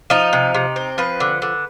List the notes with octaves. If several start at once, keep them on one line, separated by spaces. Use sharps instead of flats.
F3 D#4
C3
C3
C4
F3 B4
D3
D3